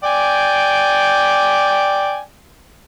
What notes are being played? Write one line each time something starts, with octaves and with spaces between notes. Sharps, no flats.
D5 G5 G#5